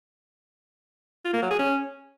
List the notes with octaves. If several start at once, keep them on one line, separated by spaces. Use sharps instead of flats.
F4
A#3
F#3
G#4
C#4